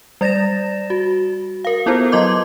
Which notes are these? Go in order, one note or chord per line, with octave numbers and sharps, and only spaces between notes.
G3 D5 A6 A#6 E7
F#4
A#4 F5
B3 E4 F4 A4 C5
F#3 F4 D#5 C6 D6 G6